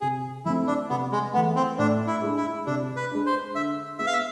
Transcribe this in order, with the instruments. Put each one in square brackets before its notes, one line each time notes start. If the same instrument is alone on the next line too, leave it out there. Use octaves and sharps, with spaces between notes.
[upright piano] C3 [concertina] G#4
[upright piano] F3 A3 C4 [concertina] E4
[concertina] D4
[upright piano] C3 [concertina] B3
[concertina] G#3
[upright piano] E3 A3 [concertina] B3
[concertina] C4
[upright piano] A2 [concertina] D4
[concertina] E4
[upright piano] G#3 D4
[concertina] E4
[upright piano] C3 [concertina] D4
[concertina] B4
[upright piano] G#3 D4
[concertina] C5
[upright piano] D3 [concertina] E5
[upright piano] G#3 B3 [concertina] E5
[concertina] F5
E5